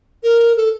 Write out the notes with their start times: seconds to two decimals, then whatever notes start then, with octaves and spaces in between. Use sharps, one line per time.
0.23 A#4
0.57 A4